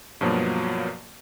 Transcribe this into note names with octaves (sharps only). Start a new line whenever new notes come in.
G2 B2 F3 F#3 A#3